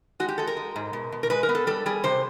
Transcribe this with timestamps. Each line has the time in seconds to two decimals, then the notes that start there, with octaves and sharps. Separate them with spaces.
0.20 G#3 F#4
0.29 G4
0.38 G#3 A4
0.47 A#4
0.57 G#3
0.76 G#2
0.93 B2
1.12 B2
1.23 A#4
1.30 G#3 B4
1.43 A#4
1.49 B3
1.55 A4
1.67 G3 A4
1.86 G3 G#4
2.04 C3 C5